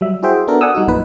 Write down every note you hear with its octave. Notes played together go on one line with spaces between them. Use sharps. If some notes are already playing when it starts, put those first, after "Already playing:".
F#3 G3 E5
E4 F#4 G#4 C5 E5 G5
B3 D4 F#4 A4 A#4
D5 F#5 G#5 D#6 E6
G3 D#4 F#4
A#1 F#2 A#2 D#4 B4